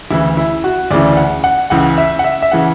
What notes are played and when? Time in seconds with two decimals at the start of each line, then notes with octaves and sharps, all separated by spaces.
0.10 D2 C#3 E3 E4
0.37 E4
0.64 F#4
0.91 D2 C#3 E3 D5
1.17 F#5
1.44 F#5
1.70 C#2 C#3 E3 F#5
1.98 E5
2.19 F#5
2.24 E5
2.42 E5
2.52 C#3 E3 F#5